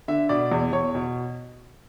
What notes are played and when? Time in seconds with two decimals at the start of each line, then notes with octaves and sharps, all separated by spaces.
0.08 D3 E5
0.29 B2 D5
0.52 E2
0.73 E2 C#5
0.95 B2